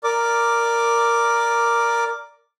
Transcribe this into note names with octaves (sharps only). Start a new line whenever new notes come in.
A#4 D5 D6